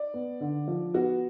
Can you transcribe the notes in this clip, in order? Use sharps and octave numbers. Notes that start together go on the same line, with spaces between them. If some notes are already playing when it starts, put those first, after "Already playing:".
Already playing: D5
B3
D3
F3
B3 F#4